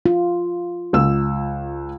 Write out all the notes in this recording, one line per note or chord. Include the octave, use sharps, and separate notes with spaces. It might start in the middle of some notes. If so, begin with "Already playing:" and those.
F4
C#2 E6